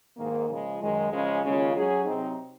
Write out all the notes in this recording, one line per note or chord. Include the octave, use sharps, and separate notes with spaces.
G#2 D#3 A#3
C#3 F3 G#3
F#2 D#3 G#3
C#3 F3 G#3 C#4
D#2 C#3 G#3 C#4 F4
F#3 C#4 G#4
C3 F#3 C4 D#4